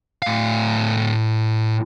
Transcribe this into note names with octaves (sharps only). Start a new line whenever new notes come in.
A2 F5